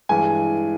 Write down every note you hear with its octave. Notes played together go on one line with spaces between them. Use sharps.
G2 E3 G#3 G#5